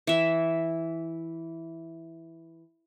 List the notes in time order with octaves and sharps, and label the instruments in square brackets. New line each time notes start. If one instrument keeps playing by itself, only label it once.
[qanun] E3 E5